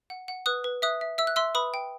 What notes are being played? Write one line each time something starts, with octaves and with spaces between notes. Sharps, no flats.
F#5
F#5
B4 D#6 F#6
B4
E5 D#6 F#6
E5
E5 E6
F#6
E5 C6 E6
B4 B5 D#6
G5